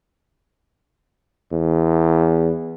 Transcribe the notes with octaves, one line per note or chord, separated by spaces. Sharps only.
E2